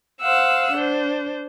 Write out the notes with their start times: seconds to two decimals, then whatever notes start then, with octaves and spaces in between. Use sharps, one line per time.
0.21 C5 F5 F#5 E6
0.73 D4 C5